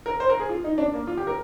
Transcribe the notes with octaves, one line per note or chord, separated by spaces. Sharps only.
A#4
C5
A#4
G#4
F4
D#4
D4
A#3
F4
G4
A#4